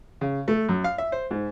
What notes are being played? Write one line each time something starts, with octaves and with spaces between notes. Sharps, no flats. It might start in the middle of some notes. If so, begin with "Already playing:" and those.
C#3
A3
F#2
F5
E5
C5
G#2